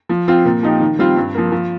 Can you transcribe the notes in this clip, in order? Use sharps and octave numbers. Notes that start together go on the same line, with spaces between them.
F3
C4 F4
A#2
F3 D#4 G4
D#3
G3 C4 F4
G2
F3 A#3
F3